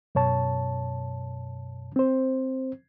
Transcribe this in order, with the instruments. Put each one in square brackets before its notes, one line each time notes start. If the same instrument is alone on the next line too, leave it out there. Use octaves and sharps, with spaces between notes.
[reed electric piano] F#2 B2 C#5 A5
C4 C5